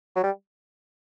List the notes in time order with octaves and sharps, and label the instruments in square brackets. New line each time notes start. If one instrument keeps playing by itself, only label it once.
[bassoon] F#3
G3